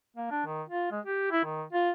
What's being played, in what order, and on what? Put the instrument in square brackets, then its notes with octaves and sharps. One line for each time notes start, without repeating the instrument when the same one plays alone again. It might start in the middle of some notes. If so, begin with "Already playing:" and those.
[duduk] A#3
D4
D#3
F4
G#3
G4
E4
D#3
F4